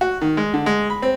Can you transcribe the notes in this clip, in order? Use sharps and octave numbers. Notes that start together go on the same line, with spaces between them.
F#4
D#3
G#3
D3
G#3
B5
C4